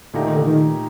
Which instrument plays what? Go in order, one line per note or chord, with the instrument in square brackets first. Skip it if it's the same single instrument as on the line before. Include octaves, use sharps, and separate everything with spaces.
[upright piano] A#2 A3 D#4 G4 [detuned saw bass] D3
[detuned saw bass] D#3
D3
D#3